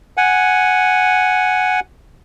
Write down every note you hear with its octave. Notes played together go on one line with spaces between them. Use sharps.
F#5 G#5